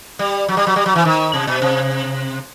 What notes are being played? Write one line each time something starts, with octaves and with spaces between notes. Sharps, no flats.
G3
F#3
G3
F#3
G3
F#3
E3
D#3
C3
B2
C3